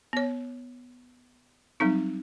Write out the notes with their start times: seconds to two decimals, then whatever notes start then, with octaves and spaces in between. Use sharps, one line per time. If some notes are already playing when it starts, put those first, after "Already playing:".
0.13 B3 C#5
1.80 F#3 G3 C4 D#4